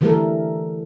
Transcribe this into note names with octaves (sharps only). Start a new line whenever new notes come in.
D3 E3 G3 A3 A4 A#4